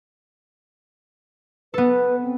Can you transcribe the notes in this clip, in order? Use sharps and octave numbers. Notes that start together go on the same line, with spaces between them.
B3 A4 B4
C4